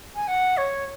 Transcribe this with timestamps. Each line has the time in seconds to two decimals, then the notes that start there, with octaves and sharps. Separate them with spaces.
0.15 G#5
0.28 F#5
0.57 C#5